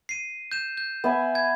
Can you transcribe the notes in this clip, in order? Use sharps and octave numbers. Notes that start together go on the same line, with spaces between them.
C7 D#7
G6 E7
G6
B3 E5 G#5
G#6